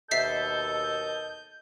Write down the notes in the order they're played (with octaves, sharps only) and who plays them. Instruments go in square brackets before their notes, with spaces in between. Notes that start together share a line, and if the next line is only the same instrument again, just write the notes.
[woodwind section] D#2 B2 A4 [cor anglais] D#5 [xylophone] E5 B6 C7 [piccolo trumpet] G6